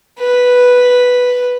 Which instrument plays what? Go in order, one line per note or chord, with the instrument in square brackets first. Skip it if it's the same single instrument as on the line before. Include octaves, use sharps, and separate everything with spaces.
[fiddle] B4